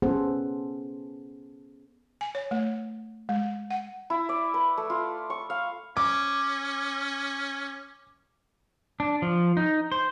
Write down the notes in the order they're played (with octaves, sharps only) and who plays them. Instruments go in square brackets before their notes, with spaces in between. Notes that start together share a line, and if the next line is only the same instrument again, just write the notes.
[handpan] B3 C#4 G#4 A4 C5 F#5
[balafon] G#5
C#5
A3
G#3
F#5
[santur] E4
D5
B4
A3
F4
C#6
F5
[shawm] C#4 [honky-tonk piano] D6
[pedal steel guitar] D4
F3
D#4
C5